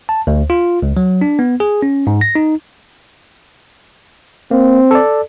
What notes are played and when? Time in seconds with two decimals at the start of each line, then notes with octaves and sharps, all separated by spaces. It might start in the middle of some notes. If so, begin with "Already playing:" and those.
0.09 A5
0.27 D2
0.50 F4
0.82 C#2
0.97 F#3
1.22 D4
1.39 B3
1.60 G#4
1.82 C#4
2.07 G#2
2.21 A#6
2.35 D#4
4.51 A#3 C4
4.91 A4 D5